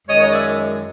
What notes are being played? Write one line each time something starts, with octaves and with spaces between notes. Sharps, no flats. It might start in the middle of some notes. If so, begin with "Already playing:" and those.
F#2 D#3 G#3 C#5 D#5
C#5 D#5
D5 E5